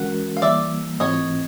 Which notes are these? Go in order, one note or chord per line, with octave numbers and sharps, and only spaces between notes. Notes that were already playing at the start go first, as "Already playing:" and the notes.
Already playing: E3 G#3 C#4 F#4 A#4 F#5
F5
E3 G3 A#3 D5 E5
G#2 E3 A3 C4 F4 C#5 D#5